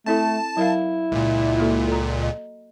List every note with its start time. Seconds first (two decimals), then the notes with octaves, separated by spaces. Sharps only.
0.06 A3 C4 E4 A4 A5
0.57 F#3 E4 A#4 F5
1.12 C#2 A#2
1.59 A#3 F#4 A4
1.88 A4 A#5
2.22 D#5